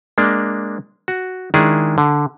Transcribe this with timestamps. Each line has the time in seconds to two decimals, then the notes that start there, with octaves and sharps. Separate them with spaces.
0.18 G#3 A#3 D4
1.08 F#4
1.54 D#3 G#3 D4 E4 G#4
1.98 D3